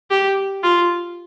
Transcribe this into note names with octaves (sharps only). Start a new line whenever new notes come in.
G4
F4